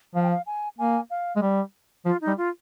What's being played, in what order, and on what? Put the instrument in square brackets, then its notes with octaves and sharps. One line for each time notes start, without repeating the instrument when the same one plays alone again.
[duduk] F3 [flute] F5
[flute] G5
F5
G#5
[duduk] A#3 [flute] G#5
[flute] F5
[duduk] G#3
G3
[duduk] F3 [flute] F4
[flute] D#4
[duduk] G3
[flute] F4